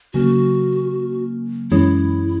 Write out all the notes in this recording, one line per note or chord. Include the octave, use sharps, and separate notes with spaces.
C#3 F#3 A#3 F#4
F#2 E3 G#3 C#4 E4